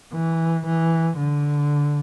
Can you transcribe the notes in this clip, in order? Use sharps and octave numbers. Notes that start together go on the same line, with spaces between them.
E3
E3
D3